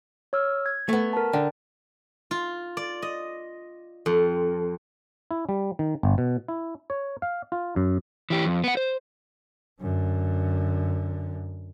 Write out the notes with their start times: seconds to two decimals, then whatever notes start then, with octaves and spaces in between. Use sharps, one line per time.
0.33 C#5 E6 F6
0.66 G#6
0.89 A3 B3
1.13 A#4 A5
1.33 D3 D5 G5
2.31 F4
2.77 D5
3.02 D#5
4.06 F2
5.31 E4
5.49 G3
5.79 D#3
6.03 G1
6.18 B2
6.48 E4
6.90 C#5
7.22 F5
7.52 F4
7.76 F#2
8.30 E3 G4
8.46 F2
8.64 B3 F#5
8.77 C5
9.81 F#2 D3